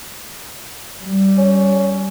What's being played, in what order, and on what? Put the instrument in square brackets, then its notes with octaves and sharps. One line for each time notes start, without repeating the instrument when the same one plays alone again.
[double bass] G3
[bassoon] C#4